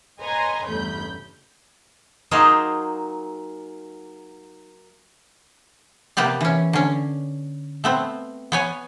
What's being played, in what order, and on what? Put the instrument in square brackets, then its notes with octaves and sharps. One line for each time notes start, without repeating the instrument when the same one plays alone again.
[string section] B4 C#5 D#5 G#5 A#5 C6
A1 E2 G2 C#3 B5 G6
[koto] F#3 A#3 D#4 G#4 C5 D#5
C3 A#3 B3 G4 D5
E3 C#4
D3 C#4
A3 B3 C4
B3 C#5 G#5